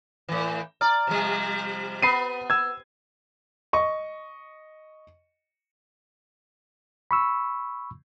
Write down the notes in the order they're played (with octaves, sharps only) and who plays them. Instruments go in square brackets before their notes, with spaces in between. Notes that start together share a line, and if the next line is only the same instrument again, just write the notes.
[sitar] A2 E3
[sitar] D5 [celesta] A#5 F6
[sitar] C3 F3 G3
[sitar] B3 [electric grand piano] B5 C7 D#7
[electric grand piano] E6 G#6
[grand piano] D#5 C#6
[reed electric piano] B5 C#6 E6